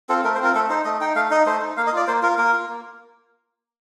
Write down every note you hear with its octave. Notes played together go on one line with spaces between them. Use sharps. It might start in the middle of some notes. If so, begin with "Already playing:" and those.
C4 F4 A4
A3 A#4
C5
C4 F4 A#4
A3 A4
D#4 C5
A3 D#5
D#4 G5
A3 F5
D#4 D#5
A3 C5
D#4
A#3 F5
D#5
F4 D5
A#3 C5
F4 A#4
A#3 A#4
F4
A#3